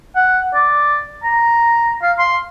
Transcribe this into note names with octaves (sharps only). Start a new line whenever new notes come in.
F#5
D5
A#5
F5
C6